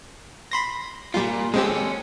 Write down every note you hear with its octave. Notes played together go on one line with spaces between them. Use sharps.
B5 C6 A#6
A#2 G3 F4
G#3 C4 C#4 G4 A4